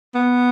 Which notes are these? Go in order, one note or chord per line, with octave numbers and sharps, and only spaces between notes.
B3